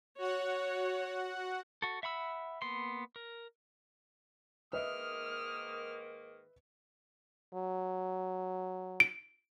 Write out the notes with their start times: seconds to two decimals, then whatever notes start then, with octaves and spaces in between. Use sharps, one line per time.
0.18 F#4 C#5 F#5
1.82 F#4 A4
2.03 E5 F#5 B5 E6
2.62 A#3 B3 C6
3.16 A#4
4.73 G#2 D#3 A#3 B4 D#5 E5 D#6 F6
7.54 F#3
9.00 D7